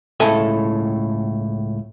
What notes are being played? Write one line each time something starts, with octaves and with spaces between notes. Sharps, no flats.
C#2 A2 A4 E5 G#5